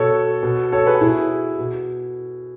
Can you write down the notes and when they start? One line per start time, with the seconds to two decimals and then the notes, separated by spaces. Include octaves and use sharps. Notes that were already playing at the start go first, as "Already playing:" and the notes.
Already playing: B2 A4 C#5
0.43 B2
0.72 A4 C#5
0.87 G#4 B4
1.01 B2 E4 G#4
1.59 B2